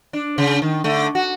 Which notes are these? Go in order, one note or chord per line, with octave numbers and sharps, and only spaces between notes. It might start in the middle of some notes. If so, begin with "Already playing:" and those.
D4
C#3
D#3
D3 A3
F#4